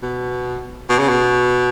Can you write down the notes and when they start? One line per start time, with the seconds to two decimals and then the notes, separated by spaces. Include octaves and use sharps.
0.03 B2
0.89 B2
0.99 C#3
1.09 B2